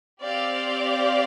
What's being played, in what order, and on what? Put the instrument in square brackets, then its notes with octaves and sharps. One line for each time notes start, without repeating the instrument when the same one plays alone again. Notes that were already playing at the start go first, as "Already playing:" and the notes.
[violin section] C4 G4 D5 F5